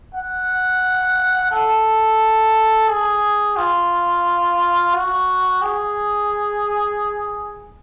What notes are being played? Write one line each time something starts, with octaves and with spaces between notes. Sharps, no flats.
F#5
A4
G#4
F4
F#4
G#4